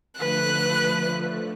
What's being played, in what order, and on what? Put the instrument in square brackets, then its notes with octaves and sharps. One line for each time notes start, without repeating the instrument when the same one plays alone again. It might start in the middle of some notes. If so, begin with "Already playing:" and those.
[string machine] D3 F3 A3 [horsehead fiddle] B4 [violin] F#6